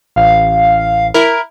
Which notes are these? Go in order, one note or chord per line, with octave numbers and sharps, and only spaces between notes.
A1 F5
E4 A#4